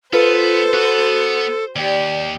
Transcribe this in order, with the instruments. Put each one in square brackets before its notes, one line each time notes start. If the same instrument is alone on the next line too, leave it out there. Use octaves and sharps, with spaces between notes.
[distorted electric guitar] B3 [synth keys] F4 B4 [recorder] A4 [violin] C5
[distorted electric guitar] B3 [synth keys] F#4
[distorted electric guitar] D#2 [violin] G4 [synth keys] D5